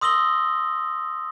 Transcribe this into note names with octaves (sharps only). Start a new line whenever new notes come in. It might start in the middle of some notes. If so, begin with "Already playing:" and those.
C6 D#6 E6 A#6 F#7 G7